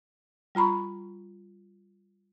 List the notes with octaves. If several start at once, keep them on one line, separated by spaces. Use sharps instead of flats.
G3 F4 A#5 B5 C#6